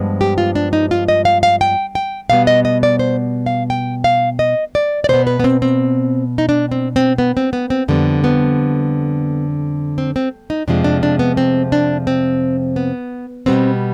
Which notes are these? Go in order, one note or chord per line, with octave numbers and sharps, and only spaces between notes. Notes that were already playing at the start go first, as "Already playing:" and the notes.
Already playing: G2 F3 G#3 B3
G4
F4
D4
D#4
F4
D#5
F5
F5
G5
G5
B2 G3 B3 F5
D#5
D#5
D5
C5
F5
G5
F5
D#5
D5
D5
B2 B3 C5
B4
B3
C4
C4
D#4
D4
C4
C4
B3
C4
B3
C4
F2 D3 G3 B3
B3
C4
C4
D#4
F2 C3 F3 G#3 D4
D4
D4
B3
C4
D4
C4
B3
B2 G3 B3 C4